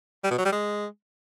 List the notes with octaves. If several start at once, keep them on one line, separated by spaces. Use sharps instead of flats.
G3
B2
F#3
G3
G#3